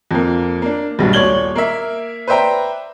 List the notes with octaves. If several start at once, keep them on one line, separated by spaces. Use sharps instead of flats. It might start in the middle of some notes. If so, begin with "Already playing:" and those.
F2 A#3
A#3 D4
B1 G2 B2
D#1 C#5 D5 G#6 F#7 G7
A#3 A#4 E5
B4 C5 D5 E5 G5 A#5